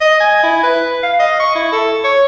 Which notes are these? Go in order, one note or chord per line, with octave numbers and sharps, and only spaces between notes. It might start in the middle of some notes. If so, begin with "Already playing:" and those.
D#5
G#5
E4
B4
F5
D#5
C#6
E4
A4
C#5